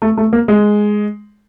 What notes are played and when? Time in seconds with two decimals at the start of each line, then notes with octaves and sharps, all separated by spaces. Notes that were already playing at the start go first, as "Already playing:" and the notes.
0.02 A3
0.17 A3
0.33 A#3
0.48 G#3